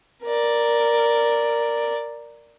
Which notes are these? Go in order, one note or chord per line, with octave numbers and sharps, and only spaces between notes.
A#4 D5